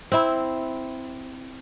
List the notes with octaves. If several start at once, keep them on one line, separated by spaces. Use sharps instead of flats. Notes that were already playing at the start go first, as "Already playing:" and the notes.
C4 E4